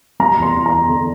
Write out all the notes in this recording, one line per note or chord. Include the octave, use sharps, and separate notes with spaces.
G3 A#5
E2
C6
E2
A#5
E2
D3